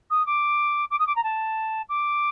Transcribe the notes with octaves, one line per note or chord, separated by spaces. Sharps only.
D#6
D6
D6
D#6
D6
A#5
A5
D6